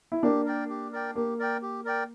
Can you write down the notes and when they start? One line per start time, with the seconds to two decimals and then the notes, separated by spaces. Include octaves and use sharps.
0.12 E4
0.23 A#3 D4 G4
0.46 A#4 D5 G5
0.69 G4
0.92 A#4 D5 G5
1.15 A#3 G4
1.39 A#4 D5 G5
1.62 G4
1.85 A#4 D5 G5